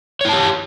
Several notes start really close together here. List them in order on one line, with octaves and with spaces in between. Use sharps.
C#5 E4 A5 G4